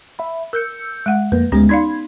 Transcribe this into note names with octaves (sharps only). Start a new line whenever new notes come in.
E5 B5
A#4 E6 G6 C#7
G#3 F#5
F2 A#3 B4
D2 G#3 B3 C#4 G4
D#4 D5 F5 B5 C6 G#6